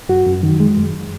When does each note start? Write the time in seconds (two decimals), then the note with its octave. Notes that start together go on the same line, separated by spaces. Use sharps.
0.09 F#2 F#4
0.26 F#2
0.43 D#3
0.60 G#3
0.77 F#2